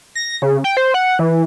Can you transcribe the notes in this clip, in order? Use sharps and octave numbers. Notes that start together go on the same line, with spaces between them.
A#6
C#3
G5
C5
F#5
E3